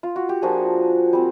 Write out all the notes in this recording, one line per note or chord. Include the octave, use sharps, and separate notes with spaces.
F4
F#4
G4
F3 A#3 D4 F4 F#4 G#4
G3 C4